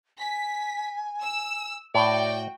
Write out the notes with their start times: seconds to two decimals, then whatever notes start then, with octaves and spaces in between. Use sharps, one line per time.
0.18 G#5 B6
1.22 E6
1.95 A2 F#4 D5 G5